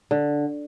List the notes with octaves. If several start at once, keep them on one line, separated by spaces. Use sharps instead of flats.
D3